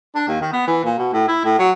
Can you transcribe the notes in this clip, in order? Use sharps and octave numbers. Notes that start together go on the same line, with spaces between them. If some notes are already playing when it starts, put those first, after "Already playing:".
D4
D#2
D#3
B3
E3
A#2
B2
A2
E4
A2
F#3